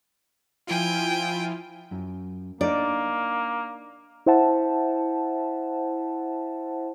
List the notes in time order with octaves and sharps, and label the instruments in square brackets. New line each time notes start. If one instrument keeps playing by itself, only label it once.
[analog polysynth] F3 E4 F4 [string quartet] G5 G#5
[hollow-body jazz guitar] F#2
[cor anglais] A#3 [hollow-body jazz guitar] D4 D#4 [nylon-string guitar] D5
[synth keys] E4 C5 E5 F#5 A5